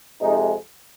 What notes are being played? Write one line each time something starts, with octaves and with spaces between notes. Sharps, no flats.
F2 C3 G#3 D#4